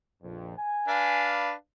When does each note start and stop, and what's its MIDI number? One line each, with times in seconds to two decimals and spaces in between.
0.22 0.55 34
0.22 0.55 41
0.57 1.30 80
0.88 1.52 62
0.88 1.52 71
0.88 1.52 77